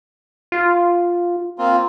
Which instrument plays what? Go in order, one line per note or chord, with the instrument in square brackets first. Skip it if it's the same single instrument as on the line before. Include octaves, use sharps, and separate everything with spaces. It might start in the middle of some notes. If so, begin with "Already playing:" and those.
[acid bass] F4
[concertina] A#3 C4 F4